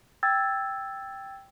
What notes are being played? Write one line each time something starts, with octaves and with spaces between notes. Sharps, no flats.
G5 E6 G#6 A6